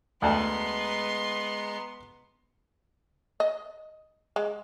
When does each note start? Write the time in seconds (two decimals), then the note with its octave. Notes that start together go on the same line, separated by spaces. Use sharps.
0.22 D2 G#3 B3 A5 A#5 C6
3.40 D#5
4.36 G#3